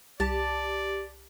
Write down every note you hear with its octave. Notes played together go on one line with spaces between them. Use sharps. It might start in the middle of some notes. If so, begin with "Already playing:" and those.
C2 G4 D5 A5